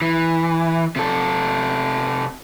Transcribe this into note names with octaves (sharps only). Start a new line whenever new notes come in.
E3
C3 A4